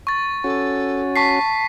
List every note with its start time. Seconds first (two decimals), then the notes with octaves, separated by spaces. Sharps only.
0.07 C#6 A6
0.44 C#4 F#4 A4
1.16 A5 C#6 B6 C7